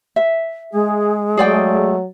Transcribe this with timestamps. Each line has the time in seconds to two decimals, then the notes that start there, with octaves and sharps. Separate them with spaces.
0.16 E5
0.73 G#3 G#4
1.37 F#3 A3 G#4 D5 G5